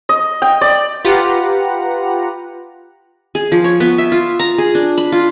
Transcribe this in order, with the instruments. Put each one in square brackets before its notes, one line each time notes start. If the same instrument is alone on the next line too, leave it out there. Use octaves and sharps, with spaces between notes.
[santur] D#5
G5
D5
[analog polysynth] F4 G4 B4 F#5 A#5
[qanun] G#4
F3
C#5
B3
E5
F4
A#5
G#4
D4
B5
F4